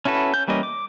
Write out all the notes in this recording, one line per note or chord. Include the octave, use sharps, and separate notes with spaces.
C#4 E4 F#4 A4 B4
C#4 G6
E3 G3 A#3 C#4 D#5
D6